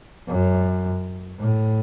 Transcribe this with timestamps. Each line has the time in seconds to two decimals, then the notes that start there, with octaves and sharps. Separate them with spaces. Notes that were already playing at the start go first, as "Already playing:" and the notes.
0.28 F#2
1.39 A2